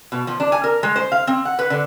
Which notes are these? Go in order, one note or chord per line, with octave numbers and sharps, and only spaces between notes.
B2
F3
D4
G#5
A#4
G#3
C5
F5
C4
F#5
B4
D3